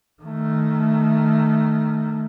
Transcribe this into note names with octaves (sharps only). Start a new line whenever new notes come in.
D#3 A3